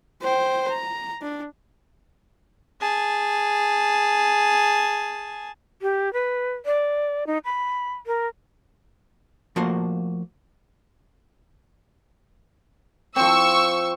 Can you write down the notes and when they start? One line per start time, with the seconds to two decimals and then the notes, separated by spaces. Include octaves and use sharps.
0.22 C5 G5
0.70 A#5
1.22 D4
2.81 G#4 A5
5.82 G4
6.13 B4
6.66 D5
7.27 D#4
7.45 B5
8.07 A#4
9.56 F3 A3 A#3 F#4 C5
13.16 F3 C4 C#6 E6